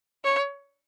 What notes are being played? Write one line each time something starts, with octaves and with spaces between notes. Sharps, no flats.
C#5